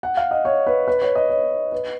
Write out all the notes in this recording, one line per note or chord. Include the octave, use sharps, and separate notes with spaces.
F#5
F5
D#5
C#5
B4
B4
C#5
D#5
C#5
B4